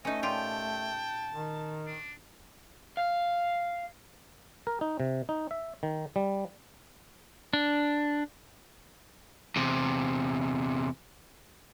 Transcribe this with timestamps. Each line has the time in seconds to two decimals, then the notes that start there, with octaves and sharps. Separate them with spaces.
0.05 A3 C#4 D#4 B4 D#5
0.23 A#2 F4 G4 G5 A5
1.32 D#3
1.87 D4
2.97 F5
4.67 A#4
4.81 D#4
5.00 C3
5.29 D#4
5.51 E5
5.83 D#3
6.16 G3
7.53 D4
9.56 E2 C3